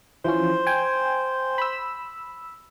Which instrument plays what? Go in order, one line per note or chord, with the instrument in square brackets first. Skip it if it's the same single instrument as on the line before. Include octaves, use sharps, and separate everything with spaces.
[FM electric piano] E3 F3 C#4 [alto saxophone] C5
[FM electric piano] G5 G#5
B5 E6